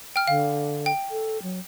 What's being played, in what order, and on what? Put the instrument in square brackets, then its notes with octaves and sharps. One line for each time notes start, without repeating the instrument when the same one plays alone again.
[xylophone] G5 F6
[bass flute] D3 [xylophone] F5
[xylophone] G5
[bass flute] A4
F#3